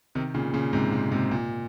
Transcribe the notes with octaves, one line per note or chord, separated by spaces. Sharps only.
C3 D#3
A#2 C#3
A#2 C#3
G#2 C3
A#2
G#2 C3
A#2